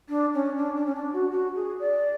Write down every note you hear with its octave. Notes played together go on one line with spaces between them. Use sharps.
D4
C#4
D4
D4
C#4
D4
F#4
F#4
G#4
D5